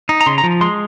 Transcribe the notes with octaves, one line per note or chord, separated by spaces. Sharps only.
D#4
A#5
C#3 C6
A#5
F3
G#3 C6